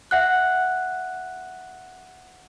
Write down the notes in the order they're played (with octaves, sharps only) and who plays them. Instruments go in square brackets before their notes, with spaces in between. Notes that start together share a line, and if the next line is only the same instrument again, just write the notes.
[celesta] E5 F#5 F#6